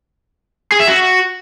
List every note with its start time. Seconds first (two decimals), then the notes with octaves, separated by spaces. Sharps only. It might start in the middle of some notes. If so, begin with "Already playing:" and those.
0.72 G#4
0.80 E5
0.88 F#4